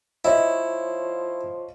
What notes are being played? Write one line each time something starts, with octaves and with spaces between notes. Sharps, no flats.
F3 E4 C#5 D#5